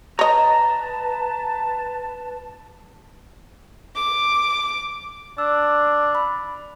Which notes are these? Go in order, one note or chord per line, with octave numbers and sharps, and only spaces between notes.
B4 C#5 D#5 A5 A#5
D6
D4 E6
B5